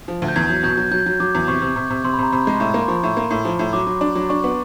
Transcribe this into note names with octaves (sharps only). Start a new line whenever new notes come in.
F3
D2
G6
E2 G#6
F#3 G6
B2 G6
F#3
F#3 G6
F#3
F#3 D6
E2
C3 C#6
C3
C3
C3
C3 C6
B5
C3 A#5
C3 B5
G#3
A2
A#3
C6
F3 C#6
A2
A#3
A2
F3
A2
F#3 D6
F#3
D4
F#3
D4 C#6
B3